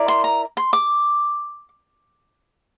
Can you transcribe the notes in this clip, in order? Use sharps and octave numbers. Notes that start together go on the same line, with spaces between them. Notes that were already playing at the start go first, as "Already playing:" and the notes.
Already playing: E4 A#4 D5
C6
A#5
C6
D6